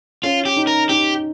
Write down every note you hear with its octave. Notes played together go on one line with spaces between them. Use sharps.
C#4 F4
G4
D#4
A#4
D#4 G4